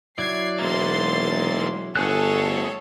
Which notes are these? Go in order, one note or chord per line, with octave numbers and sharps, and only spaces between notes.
F#3 E4 D5 G#6 C7
E1 G#2 A#3 C6 A6
G1 D2 G#4 A4 C#5 C#6 F#6